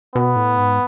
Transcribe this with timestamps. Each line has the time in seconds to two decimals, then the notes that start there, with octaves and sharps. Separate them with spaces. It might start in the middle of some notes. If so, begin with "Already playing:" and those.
0.15 B2 B3
0.36 A2
0.57 G#2